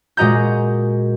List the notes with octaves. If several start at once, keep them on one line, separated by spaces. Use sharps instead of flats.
A#2 G#3 F#4 D#5 A#5 G6